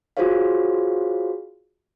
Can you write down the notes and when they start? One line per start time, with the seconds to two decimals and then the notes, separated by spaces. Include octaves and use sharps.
0.17 F4 F#4 G#4 C5 C#5 F5